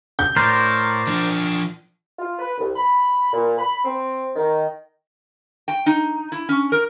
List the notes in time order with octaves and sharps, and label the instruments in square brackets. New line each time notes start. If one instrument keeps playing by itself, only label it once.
[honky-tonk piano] G6
[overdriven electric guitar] A2 [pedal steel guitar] A#4 C5 D5
[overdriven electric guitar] F3 D4
[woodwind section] F4
B4
C2
B5
A#2
B5
C4
D#3
[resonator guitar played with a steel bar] G5
D#4
E4
C#4
A#4